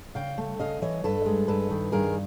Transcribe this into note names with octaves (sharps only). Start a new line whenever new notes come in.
C#3 F5 G5
A3
C#3 D#5 F5
E3 C#5 D#5
G2 A4 B4
G#3
G2 A4 B4
D#3
G2 G#4 A#4